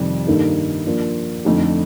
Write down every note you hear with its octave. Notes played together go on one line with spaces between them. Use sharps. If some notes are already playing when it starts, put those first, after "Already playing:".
Already playing: F2 C3 D#3 G3
G2 D#3 A#3 D#4 A4
F3 A#3 D4 F4
F2 D3 A3 D#4 A4